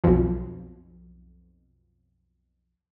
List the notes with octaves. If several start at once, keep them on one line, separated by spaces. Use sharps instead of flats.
B1 F2